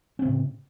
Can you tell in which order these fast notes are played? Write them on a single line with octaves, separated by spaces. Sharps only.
C#4 C4 C#3 A2